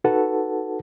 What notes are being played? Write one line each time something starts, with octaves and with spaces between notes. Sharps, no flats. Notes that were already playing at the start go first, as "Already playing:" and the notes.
D#4 F#4 A4 B4 F#5 A5